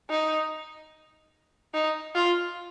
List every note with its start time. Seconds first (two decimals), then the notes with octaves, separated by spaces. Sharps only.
0.10 D#4
1.74 D#4
2.15 F4